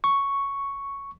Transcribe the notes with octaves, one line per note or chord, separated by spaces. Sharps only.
C#6